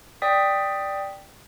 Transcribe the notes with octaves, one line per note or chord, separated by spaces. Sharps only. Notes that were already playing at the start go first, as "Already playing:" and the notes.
D5 G5 D#6 B6